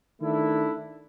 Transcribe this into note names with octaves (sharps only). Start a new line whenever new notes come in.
D#3 A3 D4 E4